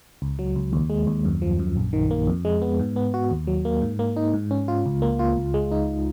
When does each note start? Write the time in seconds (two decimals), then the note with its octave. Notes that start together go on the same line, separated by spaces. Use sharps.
0.22 C#2
0.39 F#3
0.56 C#2
0.73 D#2
0.90 G#3
1.07 D#2
1.25 F#2
1.42 F3
1.59 F#2
1.77 A#1
1.93 D#3
2.11 A#3
2.27 F2
2.45 G#3
2.62 B3
2.80 G#2
2.96 B3
3.14 F#4
3.31 D#2
3.47 F#3
3.65 A#3
3.82 G#2
3.99 A#3
4.16 D#4
4.34 G#2
4.51 C#4
4.68 F4
4.86 C#2
5.02 A#3
5.19 F4
5.37 C#2
5.54 G#3
5.71 D#4